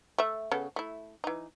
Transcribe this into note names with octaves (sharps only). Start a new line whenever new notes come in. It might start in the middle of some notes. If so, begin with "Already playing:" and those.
A3 E5
C#3 B3 A4
A3 E4
E3 D#4